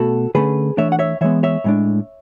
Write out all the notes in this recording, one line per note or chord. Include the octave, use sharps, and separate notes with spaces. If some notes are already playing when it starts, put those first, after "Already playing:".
Already playing: B2 A3 F#4 A4
D3 A3 C#4 G#4 B4
E3 A3 D4 C#5 E5
F#5
C#5 E5
E3 G#3 B3 C#5 E5
C#5 E5
A2 G#3 D4